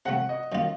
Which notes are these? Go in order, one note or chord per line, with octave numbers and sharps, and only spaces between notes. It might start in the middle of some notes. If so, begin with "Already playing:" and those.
C3 F3 A3 F#5
D#5
F#2 D#3 A#3 F4